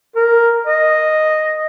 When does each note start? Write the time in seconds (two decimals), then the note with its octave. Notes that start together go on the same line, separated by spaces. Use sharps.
0.16 A#4
0.67 D#5